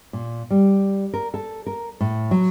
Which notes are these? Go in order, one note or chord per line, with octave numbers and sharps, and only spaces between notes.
A#2
G3
A#4
A4
A#4
A2
F#3